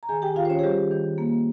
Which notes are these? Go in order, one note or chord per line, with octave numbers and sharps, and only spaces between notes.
A#5
D#3 G#4 G#5
G4 G5
D#3 F4 F5
C5
C#4 C#5
G#4
D#3 G3 G4
D#3
A#3